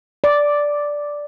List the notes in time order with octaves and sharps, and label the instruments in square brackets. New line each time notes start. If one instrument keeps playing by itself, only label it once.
[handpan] D5